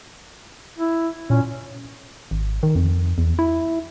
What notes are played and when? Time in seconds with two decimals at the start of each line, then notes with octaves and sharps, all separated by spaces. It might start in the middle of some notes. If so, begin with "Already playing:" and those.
0.79 E4
1.30 A#2 C#4
2.31 G#1
2.63 D#3
2.75 F2
3.18 E2
3.39 E4